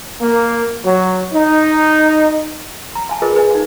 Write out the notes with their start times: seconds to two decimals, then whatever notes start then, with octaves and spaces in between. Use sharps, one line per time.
0.21 A#3
0.83 F#3
1.33 D#4
2.95 A#5
3.09 F5 G#5 A5
3.22 F4 G#4 A#4 B4 D#5
3.35 G#4 B4 D5 D#5 G#5
3.51 D#4 F5